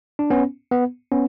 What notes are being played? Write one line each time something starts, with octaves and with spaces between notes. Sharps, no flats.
D4
B3 C#4
B3
B3 C#4